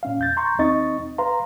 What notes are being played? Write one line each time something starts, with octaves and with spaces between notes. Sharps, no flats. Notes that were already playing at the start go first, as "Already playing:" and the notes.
A#2 C#4 F5
E2 G6 A6
A#5 C6 C#6 G6
D#2 C4 D#4 D#5 C#6 A6
B4 F5 A#5 C6